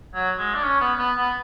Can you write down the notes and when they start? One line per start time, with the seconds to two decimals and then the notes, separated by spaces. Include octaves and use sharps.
0.15 F#3
0.38 G#3
0.55 D4
0.63 C#4
0.81 B3
0.99 B3
1.17 B3